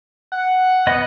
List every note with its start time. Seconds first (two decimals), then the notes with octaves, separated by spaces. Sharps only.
0.32 F#5
0.87 B3 D#5 B5